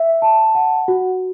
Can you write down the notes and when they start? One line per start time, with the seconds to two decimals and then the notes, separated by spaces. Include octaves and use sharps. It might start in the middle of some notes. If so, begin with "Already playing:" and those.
Already playing: E5
0.22 A5
0.55 F#5
0.88 F#4